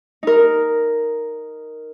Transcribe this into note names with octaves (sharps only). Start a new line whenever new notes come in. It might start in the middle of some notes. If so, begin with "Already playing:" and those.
D#4 A#4